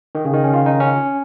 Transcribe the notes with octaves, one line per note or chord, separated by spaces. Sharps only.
D#3
C#3
D#3
C#4
F4
D#4
C#4